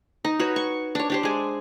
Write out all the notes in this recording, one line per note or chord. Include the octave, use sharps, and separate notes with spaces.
D#4
F#4 B4 C#5
C#6
D4 C#5
D4 G4 C5
G#3 G#5